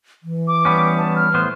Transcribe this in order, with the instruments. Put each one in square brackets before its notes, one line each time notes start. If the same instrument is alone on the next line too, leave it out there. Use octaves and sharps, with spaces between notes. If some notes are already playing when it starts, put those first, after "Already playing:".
[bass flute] E3
[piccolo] D6
[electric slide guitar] G3 B3 C#4
[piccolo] A5
F6
[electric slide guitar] A2 B3 C5